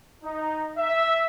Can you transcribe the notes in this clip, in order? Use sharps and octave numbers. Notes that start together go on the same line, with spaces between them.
D#4
E5